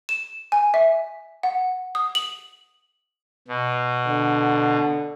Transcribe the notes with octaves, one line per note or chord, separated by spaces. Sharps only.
E7
G#5
E5
F#5
D#6
F#7
B2
D3